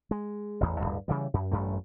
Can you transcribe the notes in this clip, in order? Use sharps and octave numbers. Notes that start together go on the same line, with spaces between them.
G#3
A1 E2
D1 C2 G2
C#3 E3 G3
F#2
A1 F#2 A3